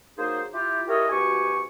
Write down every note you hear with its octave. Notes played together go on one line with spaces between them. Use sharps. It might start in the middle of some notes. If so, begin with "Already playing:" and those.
F#3 A#3 D#4 G#4 C5
E4 F4 G4
E4 G4 A4 A#4 C#5 D#5
D2 B2 G4 G#5 C#6